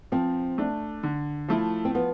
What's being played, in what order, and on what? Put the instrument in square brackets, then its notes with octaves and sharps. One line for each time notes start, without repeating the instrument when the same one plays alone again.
[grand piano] F3 [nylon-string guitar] C4
[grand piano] A3 D4
D3
F3 A3 E4
[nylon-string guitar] C4
[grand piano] F3 [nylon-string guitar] B3